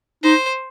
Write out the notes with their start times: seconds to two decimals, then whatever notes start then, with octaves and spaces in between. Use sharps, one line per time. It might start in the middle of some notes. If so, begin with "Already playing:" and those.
0.23 D#4 C5